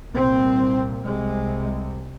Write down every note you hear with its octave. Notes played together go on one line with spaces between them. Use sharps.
C2 A#2 C4
C2 C3 G#3